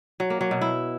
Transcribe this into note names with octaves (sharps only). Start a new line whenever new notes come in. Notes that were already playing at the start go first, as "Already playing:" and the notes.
F#3
A#3
F#3
B2
E4